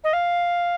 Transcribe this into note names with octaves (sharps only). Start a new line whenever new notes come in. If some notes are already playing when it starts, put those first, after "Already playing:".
D#5
F5